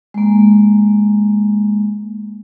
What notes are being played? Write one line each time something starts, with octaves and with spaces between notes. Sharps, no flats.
G#3 A#3